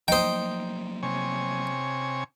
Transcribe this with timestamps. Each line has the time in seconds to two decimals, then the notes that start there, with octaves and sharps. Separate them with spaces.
0.08 F3 F#3 A#3 D#4 C5 G5 D#6
1.03 C3 C#5 G#5